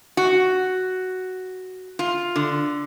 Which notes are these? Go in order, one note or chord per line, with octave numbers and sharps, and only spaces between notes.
F#4
F4
D3